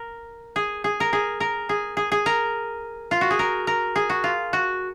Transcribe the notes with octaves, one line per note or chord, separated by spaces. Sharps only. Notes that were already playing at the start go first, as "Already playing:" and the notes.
Already playing: A#4
G#4
G#4
A#4
G#4
A#4
G#4
G#4
G#4
A#4
F4
F#4
G#4
A#4
A#4
G#4
F#4
F4
F#4